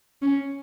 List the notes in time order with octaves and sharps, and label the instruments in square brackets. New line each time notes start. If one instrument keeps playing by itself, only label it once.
[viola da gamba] C#4